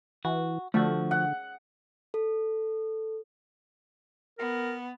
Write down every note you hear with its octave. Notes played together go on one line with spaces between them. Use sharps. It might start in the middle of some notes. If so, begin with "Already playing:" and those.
E3 F#4
D3 F3 A3 F#4
F#5
A4
B3 A#4